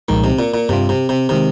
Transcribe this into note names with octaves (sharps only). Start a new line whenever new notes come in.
C2 A#2 D#3 F3 G#3 D#4
C3
A#2
A#2
G2 C3 G3 C4 F4
C3
C3
C3 D#3 G#3